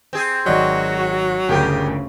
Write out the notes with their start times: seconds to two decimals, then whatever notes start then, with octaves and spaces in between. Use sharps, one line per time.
0.13 C4 G#4
0.46 G#1 F#3 F#4 D5 D#5
1.49 G1 D2 C#3 G4 G#4 A#4 G5